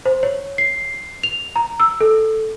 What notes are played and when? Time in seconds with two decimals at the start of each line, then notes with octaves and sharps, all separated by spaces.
0.05 C5
0.23 C#5
0.58 C7
1.23 F7
1.56 A#5
1.80 E6
2.01 A4